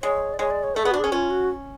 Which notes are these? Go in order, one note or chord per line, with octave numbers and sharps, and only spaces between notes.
G#3 C#5
D5
G#3 C#5
D5
C#5
A3 A4
B3 G#4
D4 F#4
C#4 G#4
C#4 F4
F#4